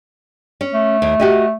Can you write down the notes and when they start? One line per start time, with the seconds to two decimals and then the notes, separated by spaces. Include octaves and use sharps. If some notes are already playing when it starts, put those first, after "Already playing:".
0.61 C#4
0.74 A3
1.02 D#2
1.20 F#4 G4 D#5